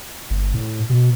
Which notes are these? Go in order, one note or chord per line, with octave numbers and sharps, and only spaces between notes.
G1
A2
B2